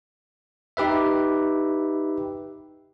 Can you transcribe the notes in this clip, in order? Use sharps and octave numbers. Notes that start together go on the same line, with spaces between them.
D#4 G4 B4 E5